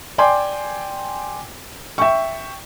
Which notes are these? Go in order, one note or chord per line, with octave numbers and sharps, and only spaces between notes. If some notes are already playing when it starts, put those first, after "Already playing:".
D5 G5 G#5 C6 D6
E5 G5 C#6